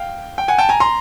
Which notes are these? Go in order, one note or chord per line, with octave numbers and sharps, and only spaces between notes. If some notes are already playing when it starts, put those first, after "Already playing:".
Already playing: F5 G5
G5
F#5 G#5
G5 A5
G#5 A#5
A#5 C6